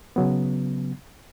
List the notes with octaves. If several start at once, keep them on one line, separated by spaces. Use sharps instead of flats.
C#3 F#3 B3